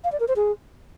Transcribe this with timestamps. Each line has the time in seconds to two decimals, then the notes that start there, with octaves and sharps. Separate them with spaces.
0.04 F5
0.12 D5
0.20 A#4
0.28 C5
0.36 G#4